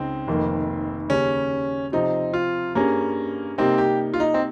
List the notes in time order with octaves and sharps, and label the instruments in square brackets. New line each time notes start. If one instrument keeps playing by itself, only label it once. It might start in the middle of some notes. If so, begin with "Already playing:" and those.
Already playing: [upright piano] C#2 C#3 D#4 [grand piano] C4
[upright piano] F1 F2 D#3 A#3 D#4
[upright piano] D#2 C#3 G3 [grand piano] C#4
[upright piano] C3 F3 C4 [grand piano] D#4
[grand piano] F4
[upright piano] G2 G3 C#4 G#4 [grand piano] A#3
[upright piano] C3 G3 A#3 D#4 [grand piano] C4
[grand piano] G4
F4
D#4
C4